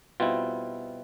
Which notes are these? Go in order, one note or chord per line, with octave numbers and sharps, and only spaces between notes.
B2 G3 C4 E4 F4